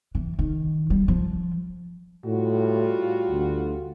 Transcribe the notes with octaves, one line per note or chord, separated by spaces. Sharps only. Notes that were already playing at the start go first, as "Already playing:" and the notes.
E3
D#3
G3
F3
A2 G3 F4 F#4
D2